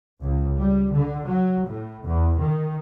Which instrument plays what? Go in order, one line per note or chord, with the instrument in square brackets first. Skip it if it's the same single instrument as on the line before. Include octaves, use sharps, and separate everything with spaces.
[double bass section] C#2
G3
D3
F#3
A2
E2
D#3